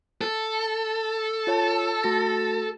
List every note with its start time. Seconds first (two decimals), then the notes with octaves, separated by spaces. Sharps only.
0.21 A4
1.47 F4 C#5 A5
2.04 A3 F#4 A#6